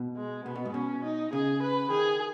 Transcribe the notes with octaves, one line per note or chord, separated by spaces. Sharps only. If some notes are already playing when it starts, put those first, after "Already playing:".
Already playing: B2
G#3
B2 B3
B2
G#2
B2 C#4
D#4
C#3 G#4
B4
D#3 G#4